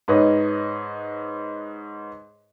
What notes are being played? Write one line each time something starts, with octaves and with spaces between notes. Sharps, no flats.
G#2 B4 C#5 D#5